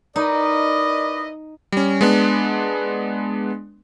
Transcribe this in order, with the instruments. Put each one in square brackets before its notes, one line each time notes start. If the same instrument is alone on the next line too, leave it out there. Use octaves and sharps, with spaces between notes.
[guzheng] D#4 [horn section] E4 B4 D#5 [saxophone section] A#4 D5
[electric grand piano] G3 C#4
G#3 B3 D4